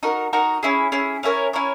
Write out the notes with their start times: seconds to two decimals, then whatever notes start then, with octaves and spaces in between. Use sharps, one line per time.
0.03 D#4 F#4 A#4
0.33 D#4 F#4 A#4
0.63 C#4 E4 G#4
0.92 C#4 E4 G#4
1.23 C#4 E4 A#4 C#5
1.53 C#4 E4 A#4 C#5